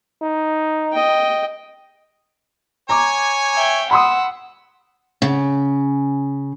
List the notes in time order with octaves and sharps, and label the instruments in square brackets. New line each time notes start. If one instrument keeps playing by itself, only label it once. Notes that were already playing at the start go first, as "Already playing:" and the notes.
[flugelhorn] D#4
[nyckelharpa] D#5 G5
[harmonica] C#5 G#5 [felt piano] A#5 D6
[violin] E5 G5
[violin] F#5 E6 [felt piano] B5 C6 D#6
[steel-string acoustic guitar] C#3